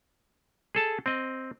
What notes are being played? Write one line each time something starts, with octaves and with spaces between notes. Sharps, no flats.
G#4 A4 A5
C4 D#5